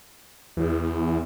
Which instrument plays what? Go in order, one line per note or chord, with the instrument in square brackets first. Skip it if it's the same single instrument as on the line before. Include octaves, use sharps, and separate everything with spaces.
[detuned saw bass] E2